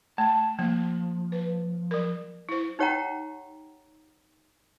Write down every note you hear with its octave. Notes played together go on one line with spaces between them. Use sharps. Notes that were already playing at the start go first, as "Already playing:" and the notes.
A3 A5
F3 A#3
B4
F#3 A#4
E4 C5
D#4 G4 C#5 F#5 G5 A#5